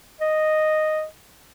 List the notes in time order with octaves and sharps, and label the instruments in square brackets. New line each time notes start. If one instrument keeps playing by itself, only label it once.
[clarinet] D#5